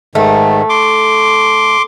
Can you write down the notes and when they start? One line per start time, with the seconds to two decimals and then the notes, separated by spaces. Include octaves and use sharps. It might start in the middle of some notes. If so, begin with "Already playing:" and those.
0.15 G#2 D#3 A3
0.69 C6 D6